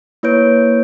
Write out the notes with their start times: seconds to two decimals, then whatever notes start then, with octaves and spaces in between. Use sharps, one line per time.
0.23 A#3 E4 B4 C#5 G6 D7